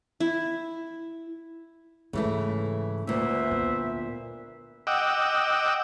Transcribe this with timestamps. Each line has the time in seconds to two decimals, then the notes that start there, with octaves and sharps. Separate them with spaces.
0.20 E4
2.13 G#2 C#3 E3 A3
3.07 D2 A#2 B4 C5 E5
3.51 B3
4.87 D#5 F#5 G5 D6 E6